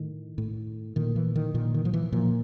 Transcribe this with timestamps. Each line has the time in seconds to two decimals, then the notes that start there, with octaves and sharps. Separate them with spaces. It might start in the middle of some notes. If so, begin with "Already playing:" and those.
Already playing: A2 D#3
0.38 A2
0.96 A#2 D#3
1.16 E3
1.36 D#3
1.54 A#2 D#3
1.74 D#3
1.85 F3
1.93 E3
2.12 A#2 F3